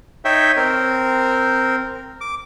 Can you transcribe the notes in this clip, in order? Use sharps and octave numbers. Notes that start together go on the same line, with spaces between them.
D#4 C#5 E5 G5
C4 A#4
D6